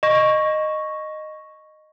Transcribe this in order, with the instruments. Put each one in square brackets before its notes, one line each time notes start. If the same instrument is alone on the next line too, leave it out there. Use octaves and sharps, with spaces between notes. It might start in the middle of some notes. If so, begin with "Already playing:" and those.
[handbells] D#5 C#6 A#6